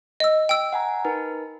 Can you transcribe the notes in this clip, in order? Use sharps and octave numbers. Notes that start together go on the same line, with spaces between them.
D#5 E6
G5 E6
F#5 G#5 A#5
D#4 A#4 B4